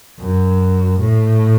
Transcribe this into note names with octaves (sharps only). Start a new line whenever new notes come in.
F#2
A2